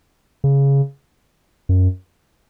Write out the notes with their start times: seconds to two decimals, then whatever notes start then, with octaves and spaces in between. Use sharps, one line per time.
0.44 C#3
1.69 F#2